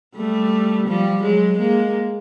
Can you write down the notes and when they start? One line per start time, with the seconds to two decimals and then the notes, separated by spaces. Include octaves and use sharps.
0.16 G3 A3
0.87 F3 G3
1.22 F#3 G#3
1.59 G#3 A#3